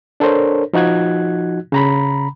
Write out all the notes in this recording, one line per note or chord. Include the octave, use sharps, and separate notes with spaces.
D4 A4 A#4 C5 C#5
F3 D#4 F#4 F#6 G#6
C#3 A#5 B5